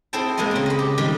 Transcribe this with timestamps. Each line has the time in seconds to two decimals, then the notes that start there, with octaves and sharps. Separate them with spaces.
0.13 C4 E4 G#4 C5 G5 A5
0.37 G#3 A#3 B3 C5 D#5
0.51 C#3 C4
0.66 D#5 B5
0.79 G4
0.98 D#3 G3 G#3